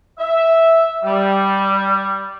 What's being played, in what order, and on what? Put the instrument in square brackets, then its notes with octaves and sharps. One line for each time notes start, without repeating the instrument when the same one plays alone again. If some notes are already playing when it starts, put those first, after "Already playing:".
[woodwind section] E5
G3